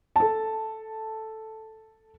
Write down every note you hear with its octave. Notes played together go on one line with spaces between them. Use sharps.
A4 A5